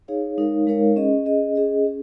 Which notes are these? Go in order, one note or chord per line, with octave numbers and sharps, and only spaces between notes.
D#4 G#4 C#5 F5
G#3 D#4 A#4 C#5 F5
G#3 D#4 A#4 C#5 F5
C#4 G#4 D#5
C#4 G#4 D#5
C#4 G#4 D#5
C#4 G#4